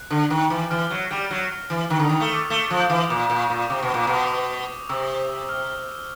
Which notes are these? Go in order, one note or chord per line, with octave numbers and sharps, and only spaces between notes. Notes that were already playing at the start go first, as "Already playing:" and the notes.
Already playing: F#6
D3
D#3
E3
E3 F6
F#3
G3
F#3
E3
D#3
D3
D#3 D#6
A3
D6
A3 D6
D6
F3
G6
E3 D#6
A#2 D6
A#2
C#6
A#2
C3 D6
B2 C#6
A#2
D6
B2
D#6
C3 E6
F6